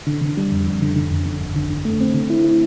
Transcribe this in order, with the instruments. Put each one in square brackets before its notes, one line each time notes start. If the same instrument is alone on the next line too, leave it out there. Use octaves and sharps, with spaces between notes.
[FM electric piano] D3
D3
G3
F2
F2
D3
D3
F2
D3
G1
D3
D3
A3
C4
D3
E4
E4